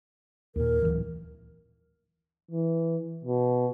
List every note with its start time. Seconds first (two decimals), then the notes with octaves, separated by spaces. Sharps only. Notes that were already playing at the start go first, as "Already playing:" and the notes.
0.56 D#2 A#2 A#4
0.82 D1 C#2 E3
2.51 E3
3.24 B2